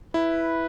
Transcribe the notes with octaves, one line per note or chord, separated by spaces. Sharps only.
E4 B4